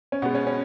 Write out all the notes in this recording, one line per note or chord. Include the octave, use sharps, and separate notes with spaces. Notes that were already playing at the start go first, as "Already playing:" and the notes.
C#4
B2 G#3 B3
C#4
C#4